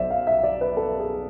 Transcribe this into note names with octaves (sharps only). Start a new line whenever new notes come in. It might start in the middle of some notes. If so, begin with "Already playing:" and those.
Already playing: B1 B2 C5 D5 E5
F5
E5
D5
B4
A4
G#4